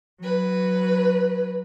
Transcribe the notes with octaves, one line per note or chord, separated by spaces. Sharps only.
F#3 B4